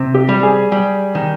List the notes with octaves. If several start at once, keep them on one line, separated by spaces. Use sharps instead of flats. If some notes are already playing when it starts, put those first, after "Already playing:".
Already playing: C3
G4
G3
G#4
G3
D#3